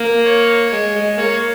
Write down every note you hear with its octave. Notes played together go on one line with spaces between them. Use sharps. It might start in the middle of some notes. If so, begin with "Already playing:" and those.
Already playing: A#3
C#5
G#3
G#3
A#3 C#5